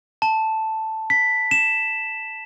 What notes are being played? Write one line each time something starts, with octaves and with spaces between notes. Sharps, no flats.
A5
B6
E7